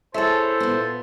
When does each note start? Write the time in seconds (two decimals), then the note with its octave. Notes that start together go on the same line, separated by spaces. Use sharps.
0.14 E4 G#4 A4 C5 C#5 E5 A5
0.60 A#2 B3